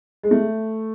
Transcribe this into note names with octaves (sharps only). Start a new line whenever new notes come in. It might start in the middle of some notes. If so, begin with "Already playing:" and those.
G#3
A3